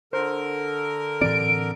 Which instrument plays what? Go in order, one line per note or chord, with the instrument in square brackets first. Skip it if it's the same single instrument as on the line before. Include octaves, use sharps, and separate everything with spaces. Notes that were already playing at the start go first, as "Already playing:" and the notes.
[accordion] D3 A#4 [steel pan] C5
[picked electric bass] A2 E3 C4 [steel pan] D5 [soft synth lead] D7